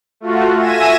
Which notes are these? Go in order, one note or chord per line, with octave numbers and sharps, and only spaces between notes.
A3 F4 F#4
E5 G#5 G#6 A#6 D#7 E7